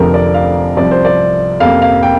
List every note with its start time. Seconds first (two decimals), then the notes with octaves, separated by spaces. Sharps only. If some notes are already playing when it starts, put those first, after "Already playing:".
Already playing: F1 F2 D3 F3 A#4
0.14 D5
0.34 F5
0.77 C2 C3 F3 D5
0.91 C5
1.05 D5
1.60 F2 C3 A#3 F5
1.82 F5
2.03 G5